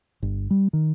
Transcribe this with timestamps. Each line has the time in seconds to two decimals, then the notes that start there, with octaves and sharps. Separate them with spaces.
0.23 G1
0.50 G3
0.73 D#3